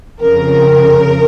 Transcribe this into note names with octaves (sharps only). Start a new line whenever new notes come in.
F2 C#3 A#4